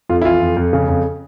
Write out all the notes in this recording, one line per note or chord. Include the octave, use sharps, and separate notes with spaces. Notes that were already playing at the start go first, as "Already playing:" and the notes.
F2 F4
E4
E3 F4
F2
F2
C#3
F2